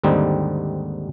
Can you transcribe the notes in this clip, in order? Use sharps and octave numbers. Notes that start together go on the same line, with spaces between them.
D#2 G#2 D3 G3 C4 D#4